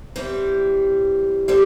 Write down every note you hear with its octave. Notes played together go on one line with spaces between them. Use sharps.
E3 G3 C4
D3 G3 C4 E4